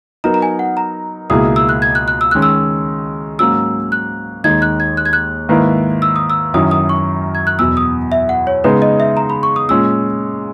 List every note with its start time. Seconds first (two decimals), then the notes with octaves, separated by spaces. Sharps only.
0.24 F#3 B3 D#4 A#4 A#5
0.34 A#5
0.42 G#5
0.59 F#5
0.77 A#5
1.30 C#2 B2 A#3 E4 G#4 D#6
1.56 E6
1.69 F#6
1.82 G#6
1.95 F#6
2.08 F#6
2.21 E6
2.31 D#3 G#3 C#4 F#6
2.42 E6
3.39 G#2 F#3 A#3 C#4 F#4 E6
3.92 F#6
4.44 D#2 D#3 G#3 D#4 G#6
4.62 F#6
4.80 G#6
4.97 F#6
5.06 G#6
5.13 F#6
5.49 G#2 D#3 A#3 E4 B4
6.02 E6
6.16 D#6
6.30 E6
6.54 F#2 D#3 F#3 C#4 E4 D#6
6.71 D#6
6.89 C#6
7.35 G#6
7.47 F#6
7.59 E2 B2 F#3 E6
7.77 D#6
8.12 E5
8.29 F#5
8.47 C#5
8.64 C#3 G#3 B3 D#4 G#4 B4
8.82 D#5
9.00 E5
9.17 A#5
9.30 B5
9.43 C#6
9.56 D#6
9.69 A#2 G#3 C#4 E6